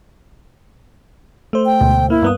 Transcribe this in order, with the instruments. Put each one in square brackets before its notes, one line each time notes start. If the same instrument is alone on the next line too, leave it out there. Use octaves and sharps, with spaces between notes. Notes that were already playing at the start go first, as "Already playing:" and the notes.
[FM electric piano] A3 C5
[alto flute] G5
[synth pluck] D2 G#2 B2
[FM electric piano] A#3 [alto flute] E4
[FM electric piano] G2 B3 D#6 [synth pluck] A#3